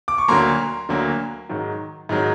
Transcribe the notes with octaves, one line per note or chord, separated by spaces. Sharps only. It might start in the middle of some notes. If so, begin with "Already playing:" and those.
D6
C#6
D2 D3 F#3 A#3 A#5 C6
D2 D3 F#3 A#3
G#2 D#3 F#3
G#2 D#3 F#3